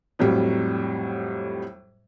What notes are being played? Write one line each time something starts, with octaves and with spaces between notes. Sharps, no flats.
F2 A2 F#3 G3